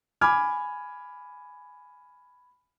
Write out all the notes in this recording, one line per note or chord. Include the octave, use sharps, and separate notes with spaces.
G#5 B5 D6 F6 G#6